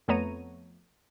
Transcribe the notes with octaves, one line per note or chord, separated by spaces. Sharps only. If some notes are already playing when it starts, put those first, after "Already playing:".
F2 A3 B3 C#5 A#5 D#7